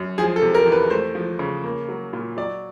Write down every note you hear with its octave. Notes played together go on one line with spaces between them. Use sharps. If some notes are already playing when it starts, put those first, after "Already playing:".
Already playing: F#2
F3 G#4
A4
C3
A#4
E2
B4
A3 C5
F3
C#3
A#3
F#3
A#2
F#3 D5